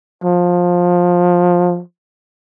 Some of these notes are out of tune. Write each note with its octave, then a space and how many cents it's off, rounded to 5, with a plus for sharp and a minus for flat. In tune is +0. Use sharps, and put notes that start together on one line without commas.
F3 +20